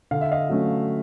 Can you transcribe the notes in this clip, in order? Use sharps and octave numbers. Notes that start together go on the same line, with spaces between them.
D3 F5
E5
D#5 F5
F#3 A3 C#4